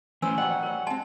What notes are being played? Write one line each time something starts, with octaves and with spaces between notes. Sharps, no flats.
E3 A3 C#4 B4 C5 G#5 E6
F#3 G3 C5 D#5 F#5 G5
A#4 C#5
G#3 C4 D#5 A5 C6